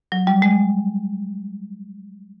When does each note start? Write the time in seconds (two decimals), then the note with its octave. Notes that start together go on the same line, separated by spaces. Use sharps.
0.12 F#3
0.27 G3
0.42 G#3